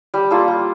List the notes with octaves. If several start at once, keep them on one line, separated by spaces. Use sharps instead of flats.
G3
A#3 F4 A4
G3